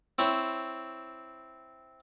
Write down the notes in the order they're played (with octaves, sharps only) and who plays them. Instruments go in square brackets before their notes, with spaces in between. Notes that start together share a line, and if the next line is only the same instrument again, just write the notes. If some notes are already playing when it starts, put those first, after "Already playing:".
[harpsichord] C4 E4 C#5